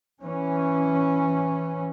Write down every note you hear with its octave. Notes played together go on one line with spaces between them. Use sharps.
E3 C#4